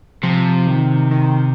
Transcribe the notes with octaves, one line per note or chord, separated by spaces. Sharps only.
C3 F3
D#3
D#3